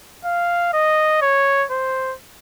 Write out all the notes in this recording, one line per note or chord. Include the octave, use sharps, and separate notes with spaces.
F5
D#5
C#5
C5